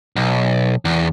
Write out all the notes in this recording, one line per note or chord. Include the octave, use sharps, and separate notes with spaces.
B1
E2